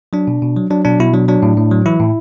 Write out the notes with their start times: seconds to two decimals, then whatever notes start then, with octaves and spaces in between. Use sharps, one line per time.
0.13 F#3 D4
0.27 B2
0.42 B2
0.57 F#3
0.71 F#3 D4
0.85 B2 D4
1.00 B2 E4
1.14 F#3 D4
1.28 F#3 D4
1.43 A2
1.57 A2
1.72 F#3
1.86 E3 E4
2.00 A2